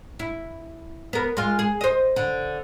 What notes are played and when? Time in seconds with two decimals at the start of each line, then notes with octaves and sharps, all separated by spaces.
0.19 E4
1.13 B3 A#4
1.37 G#3 F4
1.59 G#4
1.81 C5 D#5
2.16 D3